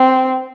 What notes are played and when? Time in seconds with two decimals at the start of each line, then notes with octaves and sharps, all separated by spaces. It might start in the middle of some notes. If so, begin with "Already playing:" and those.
Already playing: C4